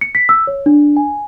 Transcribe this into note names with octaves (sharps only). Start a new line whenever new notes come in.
C#7
B6
E6
C#5
D4
G#5